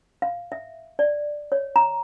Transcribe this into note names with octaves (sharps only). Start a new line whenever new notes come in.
F5
E5
D5
C#5
A#5